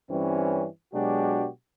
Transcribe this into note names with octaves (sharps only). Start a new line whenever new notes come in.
G2 E3 G3 C4 C#4
B2 F#3 G#3 D4 F#4 G4